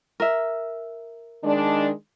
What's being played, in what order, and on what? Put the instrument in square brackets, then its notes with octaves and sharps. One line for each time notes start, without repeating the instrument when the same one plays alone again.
[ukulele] A#4 E5
[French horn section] D#3 G#3 D4